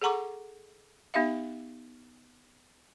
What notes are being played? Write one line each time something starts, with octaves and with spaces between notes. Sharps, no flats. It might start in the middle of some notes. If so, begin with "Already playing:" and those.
G#4 A4 F#5 A#5 C#6 D6
B3 D#4 G4 E5 F5